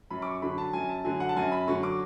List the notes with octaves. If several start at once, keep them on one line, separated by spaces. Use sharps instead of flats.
F#2 B5
D6
C#6
D3 F#3 B5
A5
F#2 G#5
A5
D3 F#3 G#5
F#5
A5
F#2 G#5
B5
D3 F#3 C#6
D6